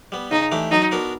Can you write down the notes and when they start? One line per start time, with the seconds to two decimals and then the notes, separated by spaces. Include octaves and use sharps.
0.12 G3 B3
0.31 C#3 D#4
0.52 E3 A3 D4 G4
0.71 F#3 D#4
0.91 B3 D4 F#4 A#4